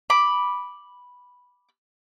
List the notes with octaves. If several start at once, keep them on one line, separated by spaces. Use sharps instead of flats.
B5 D6